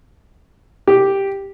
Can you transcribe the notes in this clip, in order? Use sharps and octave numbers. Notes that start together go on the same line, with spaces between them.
G4